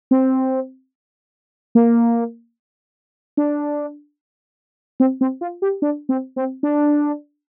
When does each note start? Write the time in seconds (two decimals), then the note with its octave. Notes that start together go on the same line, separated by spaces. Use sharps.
0.11 C4
1.75 A#3
3.37 D4
5.00 C4
5.21 C4
5.41 F4
5.62 G4
5.82 D4
6.09 C4
6.36 C4
6.63 D4